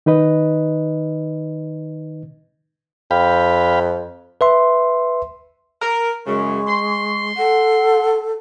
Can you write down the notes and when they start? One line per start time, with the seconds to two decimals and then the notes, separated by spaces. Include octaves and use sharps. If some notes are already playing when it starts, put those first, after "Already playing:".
0.06 D#3 D#4 B4 D#5
3.11 F2 F5 G5 B5
4.41 B4 E5 C6
5.82 A#4
6.27 F#2 C#3 G#3 C#6
6.67 C6
7.37 A4 F#5